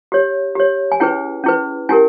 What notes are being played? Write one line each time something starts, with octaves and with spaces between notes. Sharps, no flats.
G4 C#5
G4 C#5
G#5
C#4 E4 G#4 B4 G5
C#4 E4 G#4 B4
C#4 E4 G4 A#4 G#5